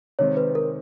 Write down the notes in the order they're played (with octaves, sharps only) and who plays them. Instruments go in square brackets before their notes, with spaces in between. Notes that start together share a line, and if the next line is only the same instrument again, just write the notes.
[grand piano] C3 D#3 G#3 C4 [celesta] C#5
[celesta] B4
A#4